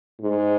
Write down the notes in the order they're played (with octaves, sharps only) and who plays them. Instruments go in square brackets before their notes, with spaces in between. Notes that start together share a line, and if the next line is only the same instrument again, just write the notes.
[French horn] G#2